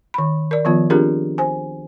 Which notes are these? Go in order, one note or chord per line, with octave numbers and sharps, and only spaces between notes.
D#3 B5
A#4 D5
D#3 F3 B3 F4
C4 D4 F4 G4 G#4 A#4
C5 G#5